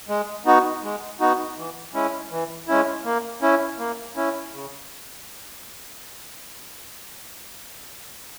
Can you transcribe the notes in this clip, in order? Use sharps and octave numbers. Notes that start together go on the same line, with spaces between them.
G#3
B3 D#4 F#4
G#3
B3 D#4 F#4
E3
G#3 C#4 E4
E3
G#3 C#4 E4
A#3
C#4 E4
A#3
C#4 E4
C#3